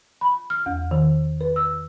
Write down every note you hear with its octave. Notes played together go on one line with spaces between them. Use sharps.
B5
F6
E2
D#3
B4
E6